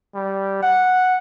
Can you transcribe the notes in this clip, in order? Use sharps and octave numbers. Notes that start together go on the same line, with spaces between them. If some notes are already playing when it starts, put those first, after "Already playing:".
G3
F#5